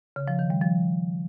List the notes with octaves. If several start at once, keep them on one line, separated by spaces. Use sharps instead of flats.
C#3
F3
D#3
G3
F3